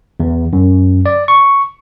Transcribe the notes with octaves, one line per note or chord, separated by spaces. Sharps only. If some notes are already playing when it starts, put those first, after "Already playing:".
E2
F#2
D5
C#6